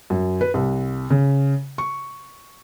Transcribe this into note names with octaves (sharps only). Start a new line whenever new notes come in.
F#2
B4
C2
C#3
C#6